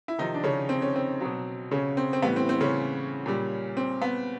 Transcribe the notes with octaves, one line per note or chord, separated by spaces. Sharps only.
E4
C3 D#3 F3 D#4
D4
C#3 C#4
C4
C#4
C4
B2 F#3
C#3 C#4
C4
C4
A2 E3 G3 B3
C4
C4
C#3 C#4
A#2 G3
C4
B3